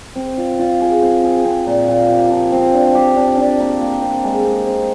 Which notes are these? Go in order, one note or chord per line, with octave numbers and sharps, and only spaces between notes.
C4
F4
F4
G#4
C4
G#4
C4
A#2
A#2
G4
F3
C4
D4
G4
D4
D4
A#3
A#3
C4
G#3
C4
C4